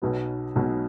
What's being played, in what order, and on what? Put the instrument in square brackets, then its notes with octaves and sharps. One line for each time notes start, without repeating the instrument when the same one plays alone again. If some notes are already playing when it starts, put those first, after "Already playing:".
[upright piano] B1 B2 F#3 B3
B1 B2 F#3 B3